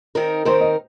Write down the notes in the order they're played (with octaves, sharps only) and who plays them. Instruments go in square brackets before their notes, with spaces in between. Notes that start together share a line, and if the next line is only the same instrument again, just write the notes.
[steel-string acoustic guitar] D#3 C4 D#4 A#4
[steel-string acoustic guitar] D#3 C4 D#4 A#4 [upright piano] C5
[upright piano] D#5